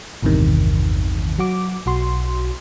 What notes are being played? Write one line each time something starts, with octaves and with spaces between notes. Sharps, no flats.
A1 E2 G2 C3 D#3
F#3 F#4 D6
B1 F#4 C6